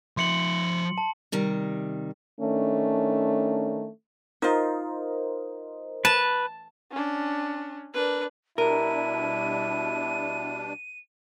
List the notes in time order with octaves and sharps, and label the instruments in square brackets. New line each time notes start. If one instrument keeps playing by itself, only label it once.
[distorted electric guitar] F3 E5 [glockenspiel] C6 C#7 F#7
[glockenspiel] A5
[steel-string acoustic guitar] C3 D#3 G3
[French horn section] D#3 A3 C#4 D4
[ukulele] D#4 F4 [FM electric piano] A#4 C5 D#5
[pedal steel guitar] B4 [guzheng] A5
[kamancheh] C#4 D4
[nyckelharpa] D4 B4 [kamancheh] A#4
[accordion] B2 G3 D4 [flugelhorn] E4 [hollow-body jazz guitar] A#4 [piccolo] D#7